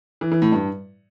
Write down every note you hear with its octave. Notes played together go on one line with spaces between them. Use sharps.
E3
E3
A2
G2